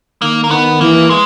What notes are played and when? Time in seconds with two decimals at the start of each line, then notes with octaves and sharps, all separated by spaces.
0.22 D#3 A#3
0.44 A#3
0.51 D#3 B3
0.81 E3 A#3
1.10 G#3